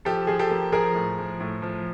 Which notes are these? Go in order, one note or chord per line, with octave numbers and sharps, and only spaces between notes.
F3 G4 A4
F3 G#4
G4 A4
A#3
F3 G#4 A#4
A2
F3
A2
F3